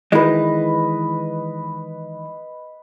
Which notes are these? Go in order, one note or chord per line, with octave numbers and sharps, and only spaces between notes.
D#3 E3 G#3 B4 D#5